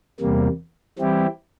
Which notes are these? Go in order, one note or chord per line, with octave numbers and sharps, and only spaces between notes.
E2 C3 G3 A#3
E3 G3 C4 E4 G4